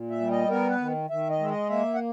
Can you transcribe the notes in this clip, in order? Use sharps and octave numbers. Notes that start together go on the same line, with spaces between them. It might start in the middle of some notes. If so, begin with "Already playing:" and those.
Already playing: A#2
E5
G3
D#5
B3 A#4
B4
D#3
D#3 E5
D#5
G#3 E5
D#5
A#3 E5
F#5